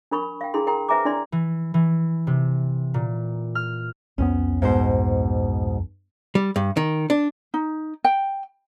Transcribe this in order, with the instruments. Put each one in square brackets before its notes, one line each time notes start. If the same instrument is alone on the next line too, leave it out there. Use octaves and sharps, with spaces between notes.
[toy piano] D4 A#4 B5 C#6
F5 G5
D4 E4 G#4 A4 C6
A#4 G5 A#5 C6
B4 C5 E5 G#5 A#5 D6
D4 E4 D5 C6
[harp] E3
E3
C3
A#2
F6
[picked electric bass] C2 F2 B3 [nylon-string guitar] C#4
[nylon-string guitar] G#2 B2 C5
[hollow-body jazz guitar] G3
G2
D#3
D4
[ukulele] D#4
G5